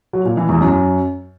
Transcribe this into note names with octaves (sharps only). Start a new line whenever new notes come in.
F#3
A#2
E3
E2
F#2